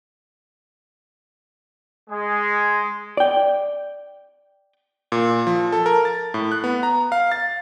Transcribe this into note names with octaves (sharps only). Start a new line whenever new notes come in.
G#3
D5 G5
A#2
F3
A4
A#4
A6
A2
F#6
B3
A#5
F5
A6